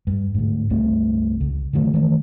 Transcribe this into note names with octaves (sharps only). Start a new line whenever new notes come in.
G2
D2 G#2
C#2 G2 A3 C4
C#2
D3 D#3 F#3 A3
D#3 E3 G#3 A3